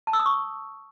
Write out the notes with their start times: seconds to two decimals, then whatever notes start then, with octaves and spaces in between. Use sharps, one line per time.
0.07 A5
0.13 E6
0.19 D#6
0.26 C#6